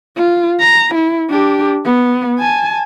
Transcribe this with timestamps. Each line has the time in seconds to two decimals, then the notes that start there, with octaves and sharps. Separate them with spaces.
0.17 F4
0.60 A#5
0.95 E4
1.30 D4 G4
1.85 B3
2.39 G#5 A5